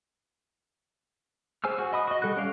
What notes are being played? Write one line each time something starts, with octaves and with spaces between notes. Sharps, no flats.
G#4 C5 G#5 E6 F6
F#4
D#5 B5 D#6
F#4 D#5
G3 A4 C#6 F#6
C#4 D5 F5